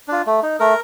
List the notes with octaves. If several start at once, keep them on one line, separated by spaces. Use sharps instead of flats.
D4 F4
A3
D#4
A3 A#4